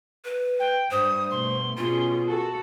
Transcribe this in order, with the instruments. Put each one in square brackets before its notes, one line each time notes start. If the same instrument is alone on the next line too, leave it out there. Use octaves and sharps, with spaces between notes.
[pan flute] B4
[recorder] G5
[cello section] G2 [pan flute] C5 [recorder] D#6
[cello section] B2 A3 [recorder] C6
[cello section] B2 C#4 G#4 [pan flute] F4
[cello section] F#4 A4